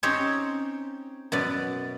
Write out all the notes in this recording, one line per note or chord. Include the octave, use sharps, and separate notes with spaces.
C4 C#4 D#4 G4 C5 C#5
F#2 B2 B4 D5